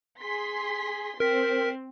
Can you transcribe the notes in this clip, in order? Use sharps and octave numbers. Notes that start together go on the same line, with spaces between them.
G#4 C6 B6
C4 A#4 B6